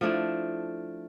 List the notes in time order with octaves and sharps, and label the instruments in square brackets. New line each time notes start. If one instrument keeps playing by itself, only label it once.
[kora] F3 A3 D4 E4